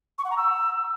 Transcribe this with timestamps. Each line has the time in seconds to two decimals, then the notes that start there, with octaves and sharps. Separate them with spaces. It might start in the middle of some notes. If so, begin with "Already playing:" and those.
0.18 C#6
0.25 F#5
0.31 A#5
0.37 E6